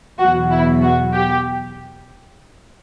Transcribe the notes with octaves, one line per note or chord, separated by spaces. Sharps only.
E2 B2 F#3 F#4
E4
F#4
G4